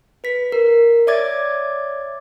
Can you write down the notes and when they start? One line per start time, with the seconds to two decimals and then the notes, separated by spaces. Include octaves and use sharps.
0.24 B4 B6
0.52 A#4
1.07 C#5 D5 E5 D6 G#6 A6